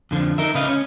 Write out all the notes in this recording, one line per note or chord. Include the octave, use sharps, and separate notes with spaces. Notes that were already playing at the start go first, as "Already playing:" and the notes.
F2 D3 D#3 F3
D#4 A#4 E5
C#3 B4 D#5 F5
C#4